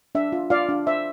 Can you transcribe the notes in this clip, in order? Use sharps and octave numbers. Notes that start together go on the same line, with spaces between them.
D4 E5
F4
F4 D5 F5
D4
C5 E5